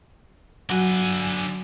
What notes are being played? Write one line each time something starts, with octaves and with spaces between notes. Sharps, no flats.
D3 F#3 F#4 G#5 F#6